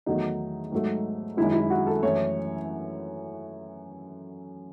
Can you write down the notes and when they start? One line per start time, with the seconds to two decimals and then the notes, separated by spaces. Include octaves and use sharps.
0.06 E2 D#3 F#3 A3 D#4
0.72 G#2 F#3 A3
1.37 F#2 D#3 G#3 E4
1.54 E4
1.70 F#4
1.87 A4
2.03 F#2 E3 A3 C#5